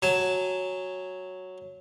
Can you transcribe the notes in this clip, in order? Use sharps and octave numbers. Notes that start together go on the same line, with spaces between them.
F#3 G#5 A5